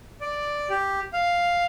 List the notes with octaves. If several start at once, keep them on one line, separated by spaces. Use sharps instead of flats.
D5
G4
F5